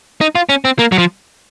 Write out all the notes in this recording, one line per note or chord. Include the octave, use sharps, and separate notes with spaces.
D#4
F4
C#4
C4
A#3
F#3
F3